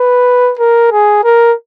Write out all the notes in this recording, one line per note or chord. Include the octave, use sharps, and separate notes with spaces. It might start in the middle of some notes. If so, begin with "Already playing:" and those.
Already playing: B4
A#4
G#4
A#4